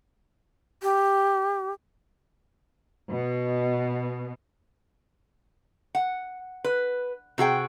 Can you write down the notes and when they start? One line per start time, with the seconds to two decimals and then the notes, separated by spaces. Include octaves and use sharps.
0.82 G4
3.10 B2
5.95 F#5
6.64 B4
7.38 C3 F#4 G#4 G5